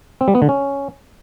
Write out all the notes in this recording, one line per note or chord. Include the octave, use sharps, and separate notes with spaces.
C4
G3
B3
D3
C#4